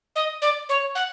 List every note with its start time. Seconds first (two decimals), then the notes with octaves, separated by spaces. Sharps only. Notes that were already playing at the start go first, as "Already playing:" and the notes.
0.15 D#5
0.42 D5
0.69 C#5
0.95 F#5